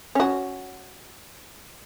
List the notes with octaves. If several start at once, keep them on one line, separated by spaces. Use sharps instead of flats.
C#4 F#4